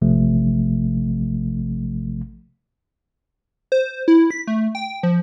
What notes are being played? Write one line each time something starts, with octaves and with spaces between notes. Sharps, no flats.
A1 C3 F3 A3
C5
E4
B6
A3
G5
F3